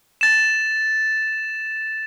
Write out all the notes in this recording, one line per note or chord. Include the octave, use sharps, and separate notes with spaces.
A6 E7